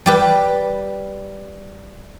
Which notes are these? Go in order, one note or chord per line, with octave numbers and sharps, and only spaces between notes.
G3 G4 B4